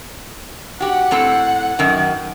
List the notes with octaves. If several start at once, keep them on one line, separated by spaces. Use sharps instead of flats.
F#4 G4 F#5
A2 C4 A4
F#2 D#3